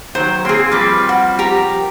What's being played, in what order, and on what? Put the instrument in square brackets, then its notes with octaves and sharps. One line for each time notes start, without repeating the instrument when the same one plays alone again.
[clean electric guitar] D#3 F#3 [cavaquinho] C5
[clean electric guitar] A#3 C4 [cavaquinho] G#4 C6
[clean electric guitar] F3 G3 C4 [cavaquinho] B4 D6
[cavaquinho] F#4
G4 A#4 A#5